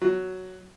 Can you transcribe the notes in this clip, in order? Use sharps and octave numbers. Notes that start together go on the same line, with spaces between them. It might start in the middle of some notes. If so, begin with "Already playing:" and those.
F#3